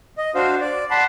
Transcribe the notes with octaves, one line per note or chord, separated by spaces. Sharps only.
D#5
D4 F#4 C5 F5
D5
F#5 A5 B5 C6